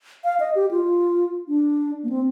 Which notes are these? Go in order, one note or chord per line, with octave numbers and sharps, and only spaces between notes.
F5
D#5
G4
F4
D4
A#3
C4